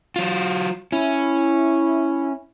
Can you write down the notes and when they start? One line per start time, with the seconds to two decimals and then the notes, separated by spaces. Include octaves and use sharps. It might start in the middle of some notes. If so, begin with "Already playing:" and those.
0.16 F#3 F4
0.92 C#4 E4